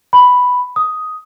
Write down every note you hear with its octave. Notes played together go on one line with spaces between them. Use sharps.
B5
D#6